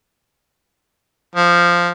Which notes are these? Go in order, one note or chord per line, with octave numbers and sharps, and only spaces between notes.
F3